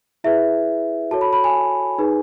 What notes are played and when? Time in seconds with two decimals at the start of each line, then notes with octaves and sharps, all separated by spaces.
0.24 E4 G#4 B4 E5
1.11 F#4 A4 C#5 A5
1.21 B5
1.33 B5
1.44 G#5
1.98 D#4 G#4 B4